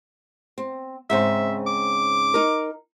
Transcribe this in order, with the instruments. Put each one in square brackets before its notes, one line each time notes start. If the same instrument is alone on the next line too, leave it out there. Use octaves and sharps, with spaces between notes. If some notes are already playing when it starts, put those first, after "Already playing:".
[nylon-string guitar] C4
[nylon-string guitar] G#2 C#3 C4 [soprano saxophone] E5
[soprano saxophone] D6
[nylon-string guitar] D#4 A#4